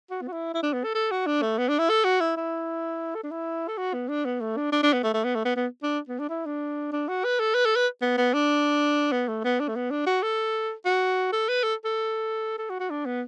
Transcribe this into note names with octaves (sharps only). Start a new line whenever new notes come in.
F#4
B3
F#4
E4
E4
D4
B3
A4
A4
F#4
D4
A3
B3
D4
E4
A4
F#4
E4
E4
A4
D4
E4
A4
F#4
B3
D4
B3
A3
D4
D4
D4
B3
A3
A3
B3
A3
B3
B3
D4
B3
D4
E4
D4
D4
F#4
B4
A4
B4
A4
B4
B3
B3
D4
B3
A3
B3
D4
A3
B3
D4
F#4
A4
F#4
A4
B4
A4
A4
A4
F#4
F#4
D4
B3